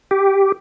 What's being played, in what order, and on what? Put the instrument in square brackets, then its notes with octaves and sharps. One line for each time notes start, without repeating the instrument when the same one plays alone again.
[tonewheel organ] G4